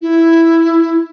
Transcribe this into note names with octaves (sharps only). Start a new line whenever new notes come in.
E4